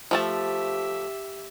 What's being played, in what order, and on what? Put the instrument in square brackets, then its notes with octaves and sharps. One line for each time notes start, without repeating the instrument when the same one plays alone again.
[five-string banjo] F3 A3 A5 [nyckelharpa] G4 E5